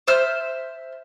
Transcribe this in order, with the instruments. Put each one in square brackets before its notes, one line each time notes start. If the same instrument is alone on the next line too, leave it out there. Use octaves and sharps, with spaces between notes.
[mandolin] C5 E5 F6